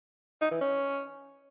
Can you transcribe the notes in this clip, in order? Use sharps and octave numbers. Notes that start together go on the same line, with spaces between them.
D#4
E3
C#4